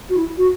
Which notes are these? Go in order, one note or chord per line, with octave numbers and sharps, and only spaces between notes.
F#4
E4
F#4